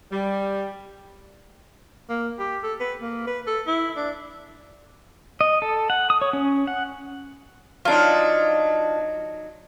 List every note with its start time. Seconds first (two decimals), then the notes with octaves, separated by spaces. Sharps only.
0.12 G3
2.10 A#3
2.39 G4
2.63 A4
2.80 B4
3.01 A#3
3.27 B4
3.47 A4
3.67 E4
3.96 D4
5.41 D#5
5.62 A4
5.90 F#5
6.10 D#6
6.22 C#5
6.33 C#4
6.67 F#5
7.85 F#3 D4 D#4 F4